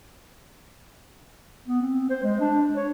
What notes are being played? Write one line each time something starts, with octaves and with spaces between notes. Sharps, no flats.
B3
C4
C5
G#3
D4
C#5